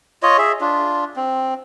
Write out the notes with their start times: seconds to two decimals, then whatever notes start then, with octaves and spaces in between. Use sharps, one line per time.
0.23 F4 C#5 D#5
0.38 G#4 E5
0.61 D4 F4
1.16 C4